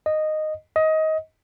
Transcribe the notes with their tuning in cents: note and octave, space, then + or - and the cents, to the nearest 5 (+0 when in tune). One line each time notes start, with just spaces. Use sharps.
D#5 -10
D#5 +20